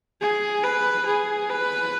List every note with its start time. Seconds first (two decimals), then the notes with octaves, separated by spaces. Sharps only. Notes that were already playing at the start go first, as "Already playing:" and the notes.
0.21 G#4
0.63 B4
1.06 G#4
1.49 B4